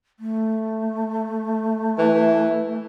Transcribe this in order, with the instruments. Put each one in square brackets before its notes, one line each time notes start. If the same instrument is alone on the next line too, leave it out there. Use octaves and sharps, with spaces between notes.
[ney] A3
[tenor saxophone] E3